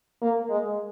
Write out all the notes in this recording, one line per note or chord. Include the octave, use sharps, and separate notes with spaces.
A#3
G#3